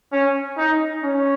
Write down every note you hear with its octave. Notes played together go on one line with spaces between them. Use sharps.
C#4
D#4
C#4